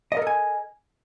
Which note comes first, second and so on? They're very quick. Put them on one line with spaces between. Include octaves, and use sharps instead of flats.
D#5 A#4 A4 G#5